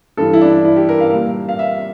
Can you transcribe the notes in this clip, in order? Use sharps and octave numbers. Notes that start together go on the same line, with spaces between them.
G2 E3 G3 A4
E4
D4
E4
G4
A#4
F5
A#2 G3
F5
E5